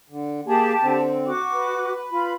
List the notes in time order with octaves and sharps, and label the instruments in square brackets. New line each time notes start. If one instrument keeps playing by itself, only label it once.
[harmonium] D3
[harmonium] A#3 G#4 [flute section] G4 A5
[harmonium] D3 C4
[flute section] F#4 D6
[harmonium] B4
[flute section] F4 B5